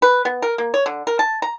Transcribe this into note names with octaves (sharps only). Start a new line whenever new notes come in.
B4
B3
A#4
A#3
C#5
D3
A#4
A5
A#5